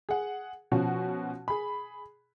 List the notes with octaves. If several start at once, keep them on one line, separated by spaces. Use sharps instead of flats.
G#4 F#5
B2 F3 C#4 F#4
G#4 B5